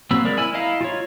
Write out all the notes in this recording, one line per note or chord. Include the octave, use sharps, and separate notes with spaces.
F#3 A#3 C4 B5 E6
G#3 A#4 D5
E4 G#5 B5 E6
E4 D#5 F5 A#5
F4 C#5